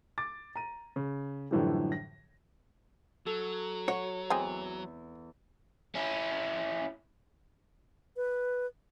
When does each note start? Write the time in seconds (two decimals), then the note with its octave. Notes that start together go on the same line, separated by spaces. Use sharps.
0.18 D6 A6
0.56 A#5 D#7
0.96 C#3
1.51 F#2 A2 D3 E3 F3 G3
1.92 A#6
3.26 F#3 A4
3.88 F#4 C#5
4.30 E2 G#3 C4 G#5
5.95 C#4 E4
8.17 B4